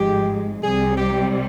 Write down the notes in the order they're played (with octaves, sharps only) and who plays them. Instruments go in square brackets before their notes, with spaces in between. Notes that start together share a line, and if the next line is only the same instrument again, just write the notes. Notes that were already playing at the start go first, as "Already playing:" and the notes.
Already playing: [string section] G#1 G#2 F3 G#3 [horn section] G4
[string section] C2 C3 G3 [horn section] G#4
[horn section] G4